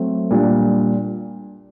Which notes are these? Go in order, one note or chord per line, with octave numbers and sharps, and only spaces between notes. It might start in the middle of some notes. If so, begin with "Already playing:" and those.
Already playing: F#3 A3 C4
A#2 G3 D4